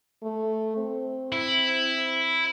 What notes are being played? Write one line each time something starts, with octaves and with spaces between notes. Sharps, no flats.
A3
C4
E4